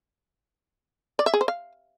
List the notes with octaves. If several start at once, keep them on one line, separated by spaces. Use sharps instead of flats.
D5
E5
G#4
C5
F5